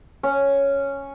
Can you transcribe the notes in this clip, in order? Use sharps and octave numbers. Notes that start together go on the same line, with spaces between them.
C#4